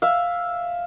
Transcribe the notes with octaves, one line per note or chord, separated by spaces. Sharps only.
E5 F5